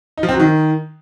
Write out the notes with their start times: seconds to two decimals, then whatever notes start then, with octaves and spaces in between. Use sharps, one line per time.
0.17 D#4
0.23 F3
0.29 C4
0.34 F#3
0.40 D#3